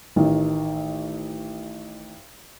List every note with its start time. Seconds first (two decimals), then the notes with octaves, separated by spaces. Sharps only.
0.16 A1 D#3